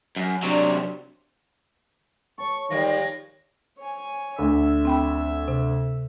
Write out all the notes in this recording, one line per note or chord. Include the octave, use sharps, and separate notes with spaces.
F#2
C3 F#3 D4
A4 C#5 C#6
D#3 F3 G3 G#3 A#6
C#5 G#5
D2 D3 E5
C4 G5 B5
C3